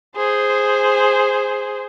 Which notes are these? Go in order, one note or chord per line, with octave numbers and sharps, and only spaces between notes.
G#4 C5